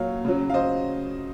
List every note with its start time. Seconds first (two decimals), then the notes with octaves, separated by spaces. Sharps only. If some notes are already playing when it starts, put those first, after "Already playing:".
Already playing: A#2 F#3 C#5 F5
0.25 C#3 F#3
0.50 F5
0.54 C5 D#5